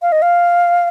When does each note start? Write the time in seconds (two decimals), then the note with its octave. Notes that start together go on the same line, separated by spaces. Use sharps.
0.02 F5
0.12 D#5
0.22 F5